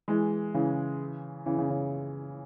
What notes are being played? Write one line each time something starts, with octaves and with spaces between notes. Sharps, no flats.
E3 G#3
C#3 E3
C#3 E3
C#3
C#3